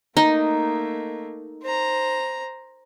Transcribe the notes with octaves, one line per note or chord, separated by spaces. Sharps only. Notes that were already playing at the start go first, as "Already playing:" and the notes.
A3 A#3 D#4
C5 A#5